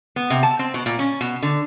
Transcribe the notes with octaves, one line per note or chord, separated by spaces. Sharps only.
B3
C3
A5
C4
B2
A#2
C#4
B2
D3